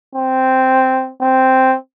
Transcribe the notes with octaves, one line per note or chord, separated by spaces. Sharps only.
C4
C4